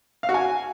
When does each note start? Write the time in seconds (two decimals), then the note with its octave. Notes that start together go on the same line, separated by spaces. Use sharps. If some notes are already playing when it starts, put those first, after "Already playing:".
0.23 F5
0.29 F#4
0.34 G#5